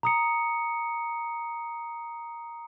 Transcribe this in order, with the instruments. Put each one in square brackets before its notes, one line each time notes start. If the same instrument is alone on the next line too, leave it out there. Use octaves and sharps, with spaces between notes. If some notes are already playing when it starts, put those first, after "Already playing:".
[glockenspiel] A#5 D#6 C#7